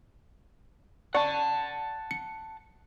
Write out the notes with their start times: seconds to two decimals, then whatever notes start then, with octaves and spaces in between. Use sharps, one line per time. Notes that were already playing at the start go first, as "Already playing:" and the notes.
1.15 D5 F#5 A5 C#6
2.11 C#7